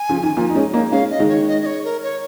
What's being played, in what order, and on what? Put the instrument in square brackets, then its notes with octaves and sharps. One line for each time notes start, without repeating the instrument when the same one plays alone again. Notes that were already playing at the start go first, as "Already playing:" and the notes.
Already playing: [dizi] G#5
[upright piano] C#3 F3
D#3
F3 A#3
D#4
G#3 C#4
A#3 D#4
[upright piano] G#3 C#4 [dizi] F5
[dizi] D#5
[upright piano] D#3 G#3
[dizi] C#5
D#5
D#5
C#5
A#4
C#5